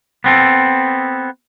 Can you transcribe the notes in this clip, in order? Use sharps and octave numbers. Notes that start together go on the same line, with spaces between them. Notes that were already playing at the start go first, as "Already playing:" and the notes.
B3 C4 A4